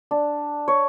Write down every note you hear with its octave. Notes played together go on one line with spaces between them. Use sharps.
D4
C#5